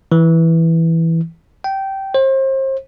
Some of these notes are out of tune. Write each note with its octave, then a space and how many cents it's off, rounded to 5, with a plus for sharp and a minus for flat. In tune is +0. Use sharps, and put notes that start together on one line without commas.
E3 -5
G5 -15
C5 +35